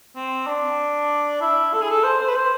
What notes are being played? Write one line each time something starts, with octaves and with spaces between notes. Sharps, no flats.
C4
D4
E4
A4
G#4
A4
C5
C5
B4
C5